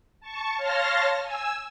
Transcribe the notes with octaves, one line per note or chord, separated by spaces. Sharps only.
A5 C#6
C#5 F5 A5 C6 F6 A#6
G#5 E6